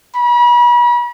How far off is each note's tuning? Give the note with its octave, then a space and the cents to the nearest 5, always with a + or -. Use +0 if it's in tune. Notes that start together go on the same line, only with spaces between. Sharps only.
B5 -40